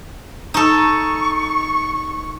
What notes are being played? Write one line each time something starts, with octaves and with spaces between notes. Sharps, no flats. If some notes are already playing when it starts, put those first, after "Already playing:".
D#4 A4 C#6